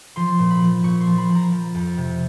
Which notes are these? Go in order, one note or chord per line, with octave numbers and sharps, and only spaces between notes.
F3 C6
A#2
B5
F3
A#2 C#6
C6
F3
B5
F3
A#5
F3
F2
C3